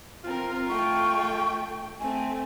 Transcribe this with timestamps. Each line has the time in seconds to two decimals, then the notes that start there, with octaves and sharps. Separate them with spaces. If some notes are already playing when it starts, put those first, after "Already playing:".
0.24 C4 F4 A#4
0.69 A3 G5 C#6
2.00 A3 C4 G#5